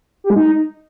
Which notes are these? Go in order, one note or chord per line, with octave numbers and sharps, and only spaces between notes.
G4
G#3
D#4